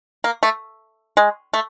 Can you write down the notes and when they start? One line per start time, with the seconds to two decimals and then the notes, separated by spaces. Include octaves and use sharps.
0.24 A#3
0.43 A3
1.17 G#3
1.53 A3